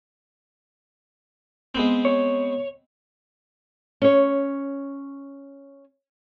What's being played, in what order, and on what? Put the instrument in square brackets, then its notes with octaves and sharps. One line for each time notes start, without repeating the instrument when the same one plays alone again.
[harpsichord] G#3 B3 C4
[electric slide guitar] C#5
[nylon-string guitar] C#4 C#5